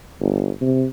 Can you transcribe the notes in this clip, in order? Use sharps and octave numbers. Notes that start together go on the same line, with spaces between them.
G1
C3